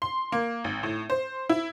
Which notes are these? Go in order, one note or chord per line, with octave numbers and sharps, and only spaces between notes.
C6
A#3
G#1
A2
C5
E4